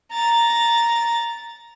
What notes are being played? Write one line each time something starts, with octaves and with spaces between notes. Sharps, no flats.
A#5 A6